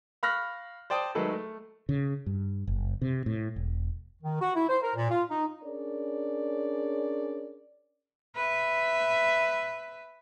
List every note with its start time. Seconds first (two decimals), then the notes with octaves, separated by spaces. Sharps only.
0.23 F5 B5 C#6 F6 F#6 A#6
0.90 C5 D5 G5 A5 D#6
1.15 D#3 F#3 G#3 A3 A4 B4
1.33 A3
1.89 C#3
2.26 G2
2.67 F#1
3.02 C3
3.26 A2
3.56 E1
4.22 D#3
4.41 F#4
4.56 E4
4.69 C5
4.82 A#4
4.95 A#2
5.11 F4
5.30 D#4
5.64 C#4 D4 G#4 A#4 C#5 D5
8.36 B4 E5